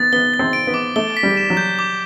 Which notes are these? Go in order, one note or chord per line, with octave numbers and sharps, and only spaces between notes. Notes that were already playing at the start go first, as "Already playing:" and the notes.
Already playing: B3 A6
B3 G7
A6
C4
D7
B3
D6
A3 G7
B6
G3
E7
F#3
G6
D6